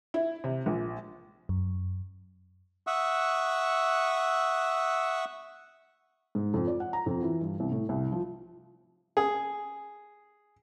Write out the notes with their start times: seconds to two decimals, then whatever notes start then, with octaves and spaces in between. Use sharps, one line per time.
0.14 E4
0.44 C3
0.66 A#1
1.49 F#2
2.87 E5 F#5 C#6 D#6 E6 F#6
6.35 G#2
6.54 F2
6.67 D5
6.80 F#5
6.93 A#5
7.06 F2
7.23 E3
7.41 G2
7.60 C2
7.72 A2
7.89 C2
8.12 F3
9.17 G#4